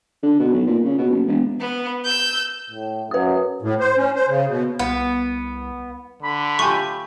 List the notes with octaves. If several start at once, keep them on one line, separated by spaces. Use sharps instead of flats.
D3
B2
B1
A#2
C#3
B2
F#1
E1
B3
E6 G6
A2
F#2 B4 D#6
A2
C5
C#4
C5
C#3
B2
C2 B3
D3 B5
A3 F4 G4 G#5 C#6